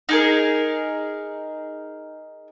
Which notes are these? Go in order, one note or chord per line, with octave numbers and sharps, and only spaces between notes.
D#4 G#4 A#4